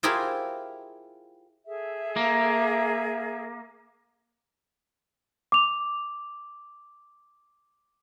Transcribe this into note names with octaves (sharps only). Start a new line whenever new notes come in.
E4 F4 G4 G#4 A#4 C5
G#4 A4 E5
A#3
D6 F7